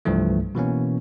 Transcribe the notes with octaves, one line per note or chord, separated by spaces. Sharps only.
C2 G2 E3 F3 A3
B2 E3 A#3 C#4